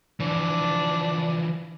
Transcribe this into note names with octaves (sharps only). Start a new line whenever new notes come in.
E3 F3 D4